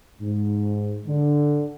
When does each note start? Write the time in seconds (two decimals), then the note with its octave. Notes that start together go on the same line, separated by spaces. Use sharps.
0.21 G#2
1.07 D3